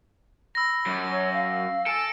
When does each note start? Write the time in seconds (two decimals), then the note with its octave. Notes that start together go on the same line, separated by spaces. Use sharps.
0.55 B5 E6 A#6
0.87 F#2
1.10 C#5
1.33 F5
1.86 A4 G#5 D7